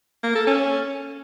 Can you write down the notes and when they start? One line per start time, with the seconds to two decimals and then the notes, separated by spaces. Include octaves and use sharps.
0.23 A#3
0.35 A4
0.47 C#4